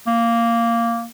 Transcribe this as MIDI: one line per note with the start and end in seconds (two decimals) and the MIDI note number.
0.07 1.06 58